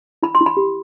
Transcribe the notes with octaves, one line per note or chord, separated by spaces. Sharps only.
E4 B5
C6
E4
B5
G4